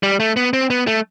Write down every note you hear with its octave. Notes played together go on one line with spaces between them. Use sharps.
G3
A3
B3
C4
B3
A3